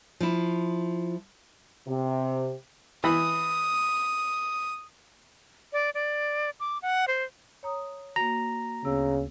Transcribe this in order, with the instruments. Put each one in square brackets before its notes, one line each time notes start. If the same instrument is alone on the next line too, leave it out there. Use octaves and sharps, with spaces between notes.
[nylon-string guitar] F3 E4
[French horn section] C3
[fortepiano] E3 B5 [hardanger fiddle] D#6
[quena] D5
D5
D6
F#5
C5
[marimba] C#5 A#5 D#6
[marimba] A#3 F#4 [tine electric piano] A#5
[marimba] D2 B3 E6 [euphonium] C#3